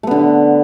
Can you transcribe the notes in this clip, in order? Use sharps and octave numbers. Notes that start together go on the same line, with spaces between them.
D3 A3 B3